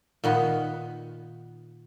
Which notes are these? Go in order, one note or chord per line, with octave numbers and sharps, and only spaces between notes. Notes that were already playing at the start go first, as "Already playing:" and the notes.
A#2 D#3 B3